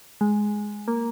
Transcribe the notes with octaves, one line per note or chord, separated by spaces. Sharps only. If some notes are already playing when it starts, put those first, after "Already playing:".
G#3
A#3